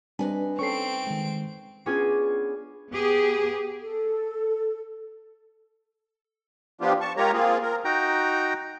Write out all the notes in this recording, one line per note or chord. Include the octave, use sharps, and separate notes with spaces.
G3 C4 D4 D#4 B4 G#5
C4 C#4 A4 C#6 C7 D7
D#3 G#3
B3 C#4 D4 F4 G#4 G#5
B3 G4 G#4
A4
F3 B3 D4 F4 G4
A5 C#6
G#3 F4 G4 A#4 C#5 A#5
A#3 C4 F4 G#4
A#4
D#4 F#4 G5 A#5